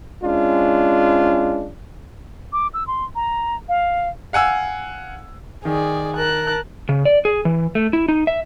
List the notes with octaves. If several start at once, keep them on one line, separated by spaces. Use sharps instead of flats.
G#3 C#4 D4 F4
D6
E6
C6
A#5
F5
F5 F#5 G#5 E6
D#3 G#4 D5
A#4 A5 F#6
C#3
D5
G#4
E3
A3
E4
D#4
E5